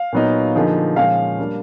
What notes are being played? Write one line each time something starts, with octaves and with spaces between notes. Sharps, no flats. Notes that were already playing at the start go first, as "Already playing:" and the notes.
Already playing: F5
A#2 F#3 B3 D#4
D3 F3 A#3 D#4 G#4
A#2 F3 G#3 C#4 F5
G3 A#3 D4